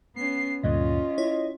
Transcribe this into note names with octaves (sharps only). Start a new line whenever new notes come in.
B3 C#4 C7
D2 G2 A#2 C#4 F4 D#5
E4 C#5